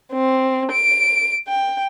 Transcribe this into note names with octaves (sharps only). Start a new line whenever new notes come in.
C4
D7
G5